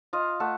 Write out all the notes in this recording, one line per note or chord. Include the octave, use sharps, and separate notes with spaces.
F4 D#5 F5
A3 E5 F#5